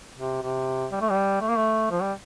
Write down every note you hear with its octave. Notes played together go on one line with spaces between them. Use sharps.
C3
C3
G3
A3
G3
A3
A#3
A3
F3
G3